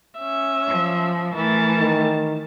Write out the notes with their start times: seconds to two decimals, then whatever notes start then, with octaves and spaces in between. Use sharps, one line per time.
0.20 C#4 E5
0.68 F3
1.35 E3 A3 A#4 A5
1.79 D#3